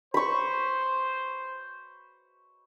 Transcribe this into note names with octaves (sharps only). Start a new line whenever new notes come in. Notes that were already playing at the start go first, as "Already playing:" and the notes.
C5 B5 C#6